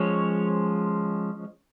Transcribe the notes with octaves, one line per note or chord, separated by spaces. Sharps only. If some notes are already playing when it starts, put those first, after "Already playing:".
Already playing: F3 G#3 C#4 C#5